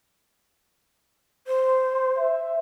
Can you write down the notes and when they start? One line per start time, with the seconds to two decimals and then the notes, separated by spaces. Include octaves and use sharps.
1.47 C5
2.18 E5